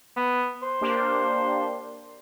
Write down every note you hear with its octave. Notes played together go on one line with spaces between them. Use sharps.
B3
C5
A#3 D4 G4